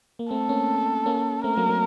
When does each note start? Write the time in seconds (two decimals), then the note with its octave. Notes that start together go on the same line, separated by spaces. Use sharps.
0.19 A#3
0.31 A3 C4 A4
0.49 A#3 C#4
1.06 A#3 C#4
1.44 A3 C4 A#4
1.57 F#3 A#3
1.69 F#3 A#3